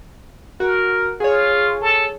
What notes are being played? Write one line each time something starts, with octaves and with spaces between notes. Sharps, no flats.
F#4 A#4
F4 G#4 C#5
A4